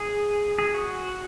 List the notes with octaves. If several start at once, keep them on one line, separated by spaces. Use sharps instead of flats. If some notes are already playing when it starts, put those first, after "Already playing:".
Already playing: G#4
G#4
F#4